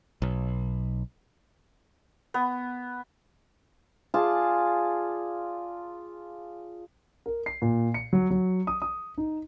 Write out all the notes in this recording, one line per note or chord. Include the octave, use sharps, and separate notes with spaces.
B1
B3
F4 G#4 D5 A5
A#4
C7
A#2
C#7
F#3
F#3
D#6
D#6
D#4